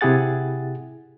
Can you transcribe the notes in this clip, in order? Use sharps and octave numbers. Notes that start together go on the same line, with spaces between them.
C3 E4 G4 G#4 F#5 A6